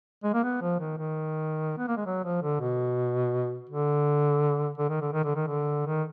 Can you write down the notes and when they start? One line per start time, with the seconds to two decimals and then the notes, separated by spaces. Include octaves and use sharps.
0.24 G#3
0.34 A#3
0.44 B3
0.62 F3
0.80 D#3
0.98 D#3
1.78 B3
1.88 A#3
1.97 G#3
2.06 F#3
2.25 F3
2.43 D3
2.61 B2
3.70 D3
4.78 D3
4.90 D#3
5.01 D3
5.13 D#3
5.24 D3
5.36 D#3
5.47 D3
5.87 D#3